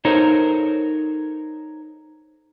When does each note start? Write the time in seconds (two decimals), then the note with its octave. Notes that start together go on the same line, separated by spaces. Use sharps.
0.05 D#4 A4 A#4 C5 C#5